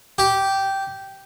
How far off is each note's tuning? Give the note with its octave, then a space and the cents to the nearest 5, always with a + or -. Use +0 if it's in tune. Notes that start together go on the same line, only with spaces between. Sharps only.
G4 -10